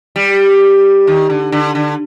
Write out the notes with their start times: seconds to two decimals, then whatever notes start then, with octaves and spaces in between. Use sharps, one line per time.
0.16 G3
1.07 D#3
1.30 D3
1.52 D3
1.75 D3